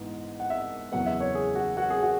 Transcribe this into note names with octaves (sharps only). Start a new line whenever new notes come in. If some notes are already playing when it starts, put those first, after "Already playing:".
Already playing: G#2 E3 B3
F#5
E5
E2 C#3 F#3 B3 F#5
E5
C#5
G#4
F#4
F#4
G#4
F#4